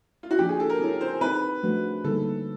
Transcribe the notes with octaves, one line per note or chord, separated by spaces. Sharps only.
F4
F#4
F3 A#3 D4 F4 G4
G#4
A4
A#4
C4 E4 G#4 C#5
C5
C4 D#4 G#4 B4 C5
F3 A3 D4 F#4 B4
D3 G3 A#3 D#4 G#4 A4